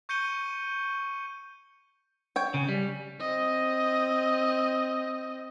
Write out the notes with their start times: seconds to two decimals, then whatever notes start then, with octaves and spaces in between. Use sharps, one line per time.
0.09 C#6 G6 C#7 D#7 G7
2.36 C#5 G5
2.54 C#3
2.69 G3
3.20 C4 D#5